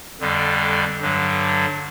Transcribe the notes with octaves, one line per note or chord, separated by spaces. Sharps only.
F2 D3 G3
G2 D3 F#3